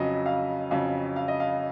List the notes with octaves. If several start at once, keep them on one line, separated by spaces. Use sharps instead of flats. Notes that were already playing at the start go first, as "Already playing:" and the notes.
Already playing: F2 C#3 F#3 D#5
F5
F2 C#3 F#3 F5
F5
D#5
F5